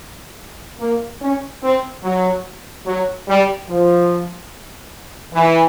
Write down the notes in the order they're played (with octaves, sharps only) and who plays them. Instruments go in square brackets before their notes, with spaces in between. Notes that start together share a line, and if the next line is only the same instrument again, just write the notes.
[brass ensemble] A#3
C#4
C4
F#3
F#3
G3
F3
E3